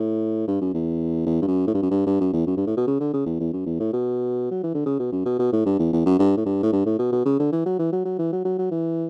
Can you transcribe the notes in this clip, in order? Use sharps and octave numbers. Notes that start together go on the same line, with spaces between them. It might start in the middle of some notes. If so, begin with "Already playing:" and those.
Already playing: A2
G2
F#2
E2
E2
G2
F#2
A2
G2
F#2
G2
G2
F#2
E2
F#2
G2
A2
B2
C#3
D3
C#3
E2
E2
F#2
E2
A2
B2
F#3
E3
D3
C#3
B2
F#2
B2
B2
A2
G2
E2
E2
F#2
G2
A2
G2
A2
G2
A2
B2
B2
C#3
D3
E3
F#3
E3
F#3
F#3
E3
F#3
F#3
F#3
E3